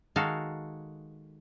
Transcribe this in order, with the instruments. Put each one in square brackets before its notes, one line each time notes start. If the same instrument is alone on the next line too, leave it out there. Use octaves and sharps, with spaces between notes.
[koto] D#3 G#3 F#4 A4 F5